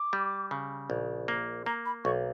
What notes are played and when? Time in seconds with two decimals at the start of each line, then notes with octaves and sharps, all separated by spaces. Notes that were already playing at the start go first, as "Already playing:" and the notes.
Already playing: D6
0.13 G3
0.51 C#3
0.90 A#1
1.28 A#3
1.66 A#3 A#5
1.85 B5
2.04 B1 C#6